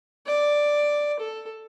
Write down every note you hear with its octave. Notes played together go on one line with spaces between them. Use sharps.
D5
A4